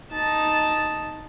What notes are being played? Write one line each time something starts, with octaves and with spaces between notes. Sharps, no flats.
D#4 A5